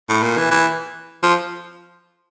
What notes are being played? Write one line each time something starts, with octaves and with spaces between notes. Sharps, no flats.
A2
A#2
E3
E3
F3